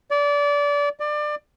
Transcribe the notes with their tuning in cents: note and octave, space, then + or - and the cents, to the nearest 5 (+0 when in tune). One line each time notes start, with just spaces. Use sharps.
D5 -25
D5 +25